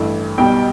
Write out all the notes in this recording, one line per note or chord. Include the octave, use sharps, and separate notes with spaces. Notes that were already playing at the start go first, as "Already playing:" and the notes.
Already playing: A1 G2 E3 A3
B1 B2 G3 G5